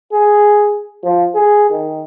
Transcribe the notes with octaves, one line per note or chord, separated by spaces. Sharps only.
G#4
F3
G#4
D#3